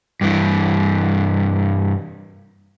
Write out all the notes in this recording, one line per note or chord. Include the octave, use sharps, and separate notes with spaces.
G2 E3